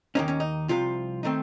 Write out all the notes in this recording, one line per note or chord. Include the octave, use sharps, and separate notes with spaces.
D#2 D#3 A#3 C#4 D#4
C#4
D#4
C2 C3 F3 F4
D#3 A3 C4 D#4